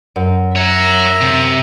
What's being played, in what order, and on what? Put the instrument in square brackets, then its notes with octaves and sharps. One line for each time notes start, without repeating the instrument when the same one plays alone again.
[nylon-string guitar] F#2
[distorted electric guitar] C#5 F#5 [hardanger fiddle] E5 A#5
[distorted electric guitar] C3